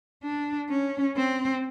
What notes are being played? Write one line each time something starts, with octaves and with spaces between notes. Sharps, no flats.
D4
C#4
C4